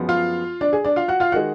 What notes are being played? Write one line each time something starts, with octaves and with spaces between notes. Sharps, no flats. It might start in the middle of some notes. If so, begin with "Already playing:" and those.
Already playing: F#2 F3 G#3 B3
F4 F5
D4 D5
G#4
D4 D5
F4 F5
F#4 F#5
F4 F5
D#3 G#3 F#4 F#5